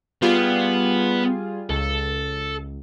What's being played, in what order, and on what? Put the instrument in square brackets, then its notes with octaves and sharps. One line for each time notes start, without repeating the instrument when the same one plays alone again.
[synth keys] G3 F4 G#4 [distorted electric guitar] B3
[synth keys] C#2 [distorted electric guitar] A4